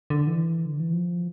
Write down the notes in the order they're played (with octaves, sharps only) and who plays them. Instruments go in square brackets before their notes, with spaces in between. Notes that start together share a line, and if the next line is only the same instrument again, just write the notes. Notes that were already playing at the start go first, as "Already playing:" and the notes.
[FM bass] D3
E3
D3
E3
F3